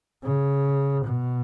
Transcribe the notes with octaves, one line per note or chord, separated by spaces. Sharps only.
C#3
B2